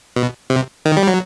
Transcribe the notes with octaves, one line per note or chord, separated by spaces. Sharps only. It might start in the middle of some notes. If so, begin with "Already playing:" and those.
B2
C3
D#3
G3
F#3